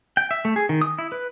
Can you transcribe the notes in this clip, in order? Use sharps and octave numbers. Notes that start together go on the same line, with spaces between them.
G5
E5
A3
G#4
D#3
D#6
E4
B4